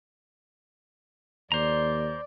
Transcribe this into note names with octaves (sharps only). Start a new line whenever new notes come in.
D#2 C5 D5 A#5